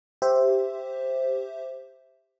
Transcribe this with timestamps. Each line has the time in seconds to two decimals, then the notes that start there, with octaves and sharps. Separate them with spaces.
0.22 G4 C5 E5